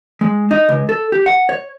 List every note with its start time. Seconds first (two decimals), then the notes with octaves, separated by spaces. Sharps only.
0.21 G#3
0.51 D#4
0.69 C#2
0.89 A4
1.12 G4
1.26 F#5
1.49 C#5